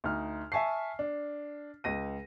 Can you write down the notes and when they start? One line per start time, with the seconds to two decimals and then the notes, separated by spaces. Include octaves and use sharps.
0.04 D2 D#4 F6
0.52 E5 G#5 A5 C#6 C7
0.99 D4
1.84 C#2 A#6 D#7